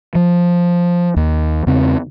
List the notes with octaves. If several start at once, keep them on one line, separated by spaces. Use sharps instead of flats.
F3
D#2
E2 C#3 C4